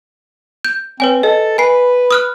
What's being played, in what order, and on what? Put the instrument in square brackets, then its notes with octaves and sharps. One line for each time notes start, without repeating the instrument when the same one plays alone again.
[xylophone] G6
[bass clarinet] C4 [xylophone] B4 C#5 G#5
[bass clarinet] A4 [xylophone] D#5
[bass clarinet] B4 [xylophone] G#5 C7
[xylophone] D#6 F6 F#6